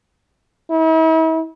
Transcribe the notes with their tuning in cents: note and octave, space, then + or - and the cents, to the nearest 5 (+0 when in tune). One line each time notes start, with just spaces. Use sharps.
E4 -45